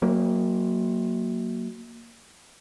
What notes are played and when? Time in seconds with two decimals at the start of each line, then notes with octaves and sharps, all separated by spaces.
0.02 F#3 A#3